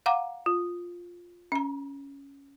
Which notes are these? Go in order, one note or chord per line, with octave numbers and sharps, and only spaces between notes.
F5 F#5 A#5 D6
F4
C#4 A#5